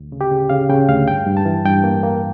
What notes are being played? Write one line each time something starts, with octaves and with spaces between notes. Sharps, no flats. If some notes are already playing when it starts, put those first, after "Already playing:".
Already playing: D2
C#3
G4
C#3
C#3 F5
C#3 G5
D2 F5
G2 G5
G2
A5
E3
G2 G5
A#3
A#3